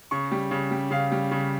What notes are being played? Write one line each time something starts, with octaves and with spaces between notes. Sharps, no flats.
C#3 C#6
G3
C#3
G3
C#3 F5
G3
C#3